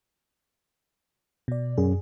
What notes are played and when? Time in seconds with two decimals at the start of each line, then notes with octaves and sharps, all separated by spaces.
1.48 B2 D5
1.78 F#2 G#4